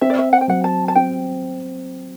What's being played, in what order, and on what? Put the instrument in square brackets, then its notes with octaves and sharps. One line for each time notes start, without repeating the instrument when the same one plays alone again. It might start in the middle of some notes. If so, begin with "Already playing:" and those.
[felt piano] C4 [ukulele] E5
[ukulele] D5
E5
F#5
G5
[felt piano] F#3 [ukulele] F#5
[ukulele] A5
A5
[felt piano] C4 [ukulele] G5